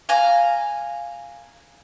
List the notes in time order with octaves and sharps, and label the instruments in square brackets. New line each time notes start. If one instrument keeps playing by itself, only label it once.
[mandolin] F5 G#5 A#5